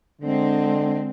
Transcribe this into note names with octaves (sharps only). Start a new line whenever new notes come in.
D3 G#3 C4